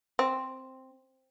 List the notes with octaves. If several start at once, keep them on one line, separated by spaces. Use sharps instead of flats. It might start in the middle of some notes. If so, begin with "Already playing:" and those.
C4